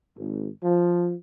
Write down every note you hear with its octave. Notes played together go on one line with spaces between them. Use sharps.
G#1
F3